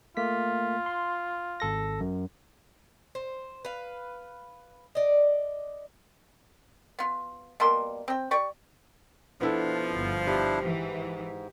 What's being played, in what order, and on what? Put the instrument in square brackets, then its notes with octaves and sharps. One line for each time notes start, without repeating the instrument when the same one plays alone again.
[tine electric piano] A3 A#3 B6 [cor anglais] F4
[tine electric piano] C6
G#1 A4 A#6
F#2
[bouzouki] C5
B4 F5
D5 D#5
[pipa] B3 F4
B2 G3 A#3 C6
C4 G5
G4 D5 C#6
[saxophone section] B2 F3 [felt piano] B3 E4 A4 [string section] D4
[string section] G1
[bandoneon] D4 E4 [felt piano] G4
[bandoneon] G#2 [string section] E3